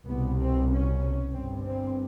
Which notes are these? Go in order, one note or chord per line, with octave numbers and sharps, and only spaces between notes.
C2 B2 B3
C4
C#4
G1 G2 C4
C4